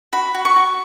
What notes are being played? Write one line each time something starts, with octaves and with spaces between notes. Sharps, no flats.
F#4 B5
F#4
C#6
F#4